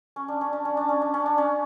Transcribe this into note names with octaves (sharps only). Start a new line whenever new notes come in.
C#4
D4
C#4
D4
C#4
D4
C#4
D4
C#4
D4
C#4